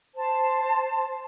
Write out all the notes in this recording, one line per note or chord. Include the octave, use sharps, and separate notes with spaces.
C5 A5